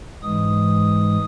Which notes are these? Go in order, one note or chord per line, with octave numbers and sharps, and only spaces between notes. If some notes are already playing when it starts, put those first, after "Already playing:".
G#2 E3 G#3 D#6